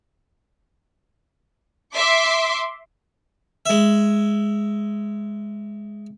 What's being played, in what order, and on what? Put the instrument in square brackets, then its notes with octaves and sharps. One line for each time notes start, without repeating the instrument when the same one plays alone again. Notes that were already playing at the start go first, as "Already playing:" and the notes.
[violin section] E5 C6 D6
[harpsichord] G#3 E5